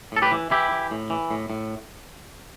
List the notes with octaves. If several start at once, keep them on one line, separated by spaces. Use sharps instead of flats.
A2 A4
G4 B4
E3
E3 E4 G4
E3
A2
E3
A2
A2